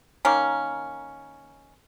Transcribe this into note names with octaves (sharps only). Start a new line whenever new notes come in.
D#3 A#3 C#4